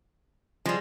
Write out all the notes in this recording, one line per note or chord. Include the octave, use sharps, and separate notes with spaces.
F3 G3 G#3